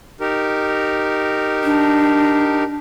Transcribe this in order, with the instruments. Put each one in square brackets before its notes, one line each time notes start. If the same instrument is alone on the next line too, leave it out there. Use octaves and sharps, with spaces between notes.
[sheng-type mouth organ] D#4 G4 A#4
[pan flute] D4